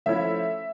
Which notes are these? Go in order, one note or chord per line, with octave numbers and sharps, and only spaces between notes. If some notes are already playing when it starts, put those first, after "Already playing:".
F3 A3 C#4 E4 E5